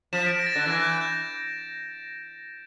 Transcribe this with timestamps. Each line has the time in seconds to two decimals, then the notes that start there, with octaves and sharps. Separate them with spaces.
0.13 F3 E7
0.26 D7
0.39 A#6
0.46 A6
0.52 A#6
0.55 D3
0.66 E3 A6
0.83 G6
1.01 G6